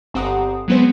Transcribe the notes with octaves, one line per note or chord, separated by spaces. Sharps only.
G1 C4 G4 F#5 A#5 D#6
F#3 G#3 B3 C4 C5